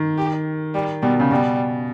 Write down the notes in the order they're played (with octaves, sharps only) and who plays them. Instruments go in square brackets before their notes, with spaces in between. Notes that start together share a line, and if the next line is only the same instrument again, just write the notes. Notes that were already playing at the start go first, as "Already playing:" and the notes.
Already playing: [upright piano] D#3
[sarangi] G4
G3
[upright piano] B2 [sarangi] G3
[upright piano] C#3
[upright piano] B2 [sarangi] G3